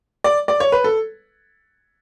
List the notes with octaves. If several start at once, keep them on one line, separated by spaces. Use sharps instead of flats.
D5
D5
C#5
B4
A4